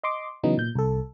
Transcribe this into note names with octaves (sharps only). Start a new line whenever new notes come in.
D#5 C6 D6
C#3 E3 F#3 B3 D#4
A#2 G6
C2 A4